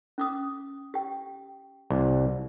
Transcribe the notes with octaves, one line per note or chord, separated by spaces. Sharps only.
C#4 D6 D#6
G4 G5
C2 D6